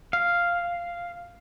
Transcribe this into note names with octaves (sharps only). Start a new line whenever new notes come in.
F5